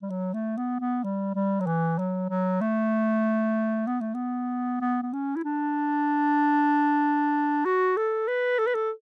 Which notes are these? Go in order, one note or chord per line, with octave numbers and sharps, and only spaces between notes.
G3
F#3
A3
B3
B3
G3
G3
F#3
E3
F#3
F#3
A3
B3
A3
B3
B3
B3
C#4
E4
D4
F#4
A4
B4
A4
B4
A4